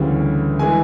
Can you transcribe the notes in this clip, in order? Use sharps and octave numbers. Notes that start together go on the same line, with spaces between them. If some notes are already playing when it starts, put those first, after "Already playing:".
Already playing: D2 C#3 E3 G3
E3 G#3 G#5